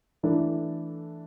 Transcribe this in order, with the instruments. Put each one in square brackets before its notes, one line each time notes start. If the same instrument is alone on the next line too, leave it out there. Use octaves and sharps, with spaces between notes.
[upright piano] E3 A3 D4 A4